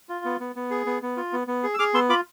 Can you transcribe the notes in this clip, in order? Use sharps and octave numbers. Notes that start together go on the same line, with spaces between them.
F4
B3
B3
B3
G#4
B3
B3
F4
B3
B3
G#4
E6
G#4 D6 F6
B3 C6 E6
F4 B5 D6